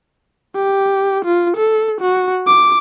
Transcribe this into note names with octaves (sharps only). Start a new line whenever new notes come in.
G4
F4
A4
F#4
D6